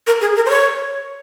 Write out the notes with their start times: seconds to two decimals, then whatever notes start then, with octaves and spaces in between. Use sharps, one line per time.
0.07 A#4
0.21 G#4
0.36 A#4
0.46 C5
0.50 C#5